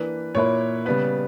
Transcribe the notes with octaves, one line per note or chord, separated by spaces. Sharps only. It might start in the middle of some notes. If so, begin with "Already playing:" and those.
Already playing: E3 A#3 D4 B4
A#2 A#3 E4 B4 C#5
C#3 G3 B3 B4